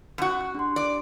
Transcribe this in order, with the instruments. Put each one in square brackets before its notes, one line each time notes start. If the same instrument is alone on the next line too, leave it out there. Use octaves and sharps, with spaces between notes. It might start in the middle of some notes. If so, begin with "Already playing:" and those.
[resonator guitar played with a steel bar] F#2 F#4
[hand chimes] F#6
D4 G4 C6
[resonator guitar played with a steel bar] D5